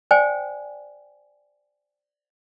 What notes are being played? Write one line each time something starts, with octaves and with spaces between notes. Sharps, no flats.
C5 D5 G5 G#5